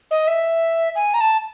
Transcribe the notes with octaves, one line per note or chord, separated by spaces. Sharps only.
D#5
E5
G#5
A#5
A5